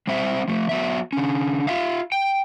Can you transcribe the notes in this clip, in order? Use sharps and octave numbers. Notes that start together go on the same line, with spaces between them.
G3 C4 C5 E5
F3 A3
F#3 B3 E5
D3 C#4
F4 E5 F5
G5